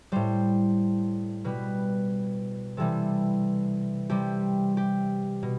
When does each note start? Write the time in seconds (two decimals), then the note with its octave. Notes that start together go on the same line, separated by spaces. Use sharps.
0.12 A2 G3 C5
1.44 B2 G3 B4
2.77 C3 E3 G3 A4
4.10 C3 G3 G4
4.77 G4
5.43 B2